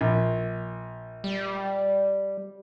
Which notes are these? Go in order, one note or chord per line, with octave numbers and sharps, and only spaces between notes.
A#1
G3